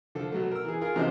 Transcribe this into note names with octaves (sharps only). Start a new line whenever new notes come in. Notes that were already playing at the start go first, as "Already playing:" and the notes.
D3 F3 A4
B2 F#3 A3
A#4 E6
E3 G#4
F4 G#4 A#4
E2 C3 F3 D4 D#4 C5